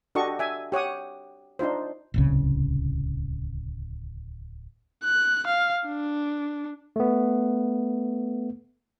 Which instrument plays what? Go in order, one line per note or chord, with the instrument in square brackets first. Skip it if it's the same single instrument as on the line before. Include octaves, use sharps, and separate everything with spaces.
[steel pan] D4 F#4 G4 A4 D#5 C#6
E5 G#5
G4 C#5 F#5 D#6
D4 D#4 F4 C5
[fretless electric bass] D1 C2 C#3
[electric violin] F#6
F5
D4
[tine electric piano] A3 B3